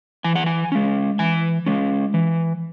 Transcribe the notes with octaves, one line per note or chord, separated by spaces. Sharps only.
E3 G#5
F#5
G#5
G#3 C#4
E3 G#5
G#3 C#4
E3